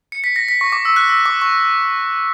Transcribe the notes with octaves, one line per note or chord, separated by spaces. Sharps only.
C#7
B6
A#6
B6
C#6
D6
E6
F#6
E6
D6
C#6